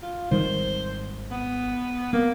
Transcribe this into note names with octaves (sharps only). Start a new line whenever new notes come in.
F4
G#1 D#3 G3 C5
B3
A#3 B3